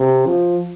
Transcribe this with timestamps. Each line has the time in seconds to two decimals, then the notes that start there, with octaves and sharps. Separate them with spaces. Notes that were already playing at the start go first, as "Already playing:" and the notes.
Already playing: C3
0.26 F3